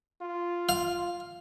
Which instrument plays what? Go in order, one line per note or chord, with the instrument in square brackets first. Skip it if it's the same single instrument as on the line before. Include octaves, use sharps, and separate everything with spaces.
[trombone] F4
[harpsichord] F5